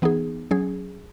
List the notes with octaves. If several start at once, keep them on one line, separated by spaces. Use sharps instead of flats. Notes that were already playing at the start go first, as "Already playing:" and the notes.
E3 B3 D#4 G#4
F#3 C#4 G#4